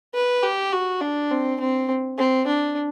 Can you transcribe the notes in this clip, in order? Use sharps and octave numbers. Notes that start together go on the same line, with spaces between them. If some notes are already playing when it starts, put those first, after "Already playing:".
B4
G4
F#4
D4
C4
C4
C4
D4